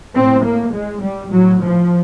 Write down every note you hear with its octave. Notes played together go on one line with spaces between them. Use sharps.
A2 C4
A#3
G#3
G3
A2 F#3
F3